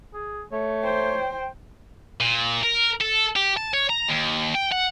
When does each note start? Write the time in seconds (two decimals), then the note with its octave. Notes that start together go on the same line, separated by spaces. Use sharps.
0.14 G#4
0.52 A3 C#5
0.83 C5 G5
2.21 A#2
2.64 A#4
3.01 A4
3.36 G4
3.57 A5
3.74 C#5
3.90 A#5
4.09 D#2
4.54 G5
4.72 F#5